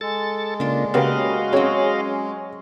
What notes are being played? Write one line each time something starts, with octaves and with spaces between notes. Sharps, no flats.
G#3 A4 A6
C#3 A#3 D4 F4
C#3 A#3 B3 C#4 F#4 G4 D#5 F5
F#3 C4 C#4 G#4 C#5